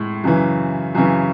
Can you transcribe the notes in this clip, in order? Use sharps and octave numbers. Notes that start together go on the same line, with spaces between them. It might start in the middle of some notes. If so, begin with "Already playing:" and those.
Already playing: A2 G#3
F#2 C#3 E3
F#2 C#3 E3